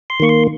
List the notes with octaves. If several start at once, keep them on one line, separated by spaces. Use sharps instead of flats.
C6
D#3 A#3 C#6
C6